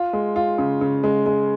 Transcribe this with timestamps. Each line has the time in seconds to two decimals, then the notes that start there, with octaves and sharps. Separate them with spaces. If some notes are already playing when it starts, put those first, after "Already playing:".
Already playing: F4
0.13 G#3
0.36 F4
0.58 C#3
0.81 C#3
1.04 G#3
1.26 G#3